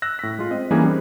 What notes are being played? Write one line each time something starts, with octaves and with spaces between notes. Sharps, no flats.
E6 F#6 A#6
A2 B6
G#3 F4
C4 D#5
E3 G3 A#3 C#4 D#4 G#4
G3 C4